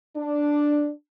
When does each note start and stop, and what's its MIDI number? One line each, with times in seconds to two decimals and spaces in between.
0.17 0.90 62